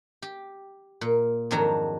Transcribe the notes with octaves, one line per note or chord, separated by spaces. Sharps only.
G4
A#2
F2 G#2 D#3 F#3 D4 A#5